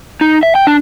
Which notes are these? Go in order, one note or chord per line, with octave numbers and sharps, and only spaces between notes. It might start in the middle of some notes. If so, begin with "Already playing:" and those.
D#4
E5
G5
D4